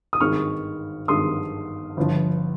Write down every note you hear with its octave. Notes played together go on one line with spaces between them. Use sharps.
D#6
G#1 G2 D#3 G#3 C#6 F6
G#1 G2 D#3 G#3 C6 D#6
G1 G2 F3